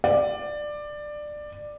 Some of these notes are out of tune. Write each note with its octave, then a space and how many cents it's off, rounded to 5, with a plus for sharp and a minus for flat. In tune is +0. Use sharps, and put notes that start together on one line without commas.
D5 +15